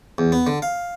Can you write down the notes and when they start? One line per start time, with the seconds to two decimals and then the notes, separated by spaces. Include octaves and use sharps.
0.18 E2
0.32 B3
0.47 D3
0.62 F5